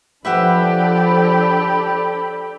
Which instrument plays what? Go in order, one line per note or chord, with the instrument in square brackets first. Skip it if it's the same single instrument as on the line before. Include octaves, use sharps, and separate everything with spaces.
[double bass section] F3 [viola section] D4 A4 B5 [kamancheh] G4 [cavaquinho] B4 E5 F#5